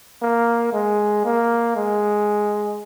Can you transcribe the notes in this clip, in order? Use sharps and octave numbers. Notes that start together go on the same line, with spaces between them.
A#3
G#3
A#3
G#3